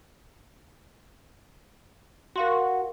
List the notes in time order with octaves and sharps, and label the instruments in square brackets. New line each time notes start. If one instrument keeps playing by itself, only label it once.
[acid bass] F#4 [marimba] A#4 F5 C6